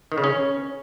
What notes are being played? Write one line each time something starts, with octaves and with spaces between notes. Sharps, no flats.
D#3
C#3
C#4